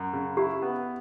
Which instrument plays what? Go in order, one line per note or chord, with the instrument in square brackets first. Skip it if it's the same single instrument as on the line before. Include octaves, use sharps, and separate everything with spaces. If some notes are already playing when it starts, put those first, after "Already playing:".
Already playing: [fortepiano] F#2
C#3
[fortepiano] E4 [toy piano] G4
[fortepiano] B3